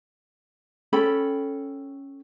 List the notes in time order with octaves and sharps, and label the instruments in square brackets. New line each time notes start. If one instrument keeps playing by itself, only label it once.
[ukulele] C#4 A4 G5 B5